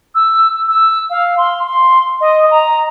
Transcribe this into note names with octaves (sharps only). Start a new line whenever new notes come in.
E6
E6
F5
C6
C6
D#5
A#5